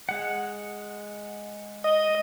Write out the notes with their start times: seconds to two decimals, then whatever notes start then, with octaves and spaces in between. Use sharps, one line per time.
0.09 G#3 F#5
1.84 D#5